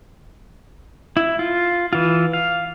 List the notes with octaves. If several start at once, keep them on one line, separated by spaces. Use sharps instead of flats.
E4
F4
E3 F4
F5